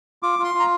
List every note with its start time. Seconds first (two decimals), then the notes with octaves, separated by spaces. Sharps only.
0.23 F4 D6
0.39 F4
0.44 C6
0.54 F4
0.60 A#5